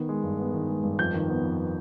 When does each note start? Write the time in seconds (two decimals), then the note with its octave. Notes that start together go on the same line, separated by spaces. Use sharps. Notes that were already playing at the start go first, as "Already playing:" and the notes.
Already playing: D#3 B3
0.09 G#3
0.24 G2
0.39 B3
0.54 D#3
0.69 G#3
0.83 G2
0.99 F2 G6
1.14 D#3
1.29 B3
1.44 F2